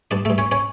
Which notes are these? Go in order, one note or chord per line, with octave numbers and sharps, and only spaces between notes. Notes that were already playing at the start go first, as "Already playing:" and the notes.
G2 D4 D5
A3 A4
G2
C#4 C#5
C#4 C#5